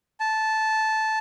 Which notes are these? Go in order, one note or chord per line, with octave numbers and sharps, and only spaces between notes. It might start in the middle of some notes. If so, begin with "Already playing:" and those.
A5